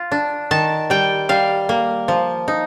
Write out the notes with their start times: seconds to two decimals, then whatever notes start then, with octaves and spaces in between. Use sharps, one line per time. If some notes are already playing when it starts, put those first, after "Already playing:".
Already playing: F4
0.12 D4
0.51 D#3 A5
0.90 G3 G5
1.29 G3 F5
1.69 A#3
2.08 F3
2.48 D#4